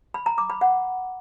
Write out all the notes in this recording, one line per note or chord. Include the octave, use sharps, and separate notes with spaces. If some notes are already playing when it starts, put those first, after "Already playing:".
B5
A#5
D6
B5
F#5